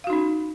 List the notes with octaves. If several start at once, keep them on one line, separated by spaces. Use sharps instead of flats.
C#4 D#4 F#4 F5